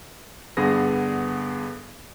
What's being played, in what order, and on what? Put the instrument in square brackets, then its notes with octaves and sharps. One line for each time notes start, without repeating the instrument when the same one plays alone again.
[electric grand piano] G2 D3 B3 G#4 A#6